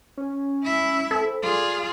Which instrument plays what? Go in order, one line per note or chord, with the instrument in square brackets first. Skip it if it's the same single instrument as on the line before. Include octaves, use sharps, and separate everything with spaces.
[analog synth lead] C#4
[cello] E4 E5
[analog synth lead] C4 [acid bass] A4
[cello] F4 G#4 [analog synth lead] D5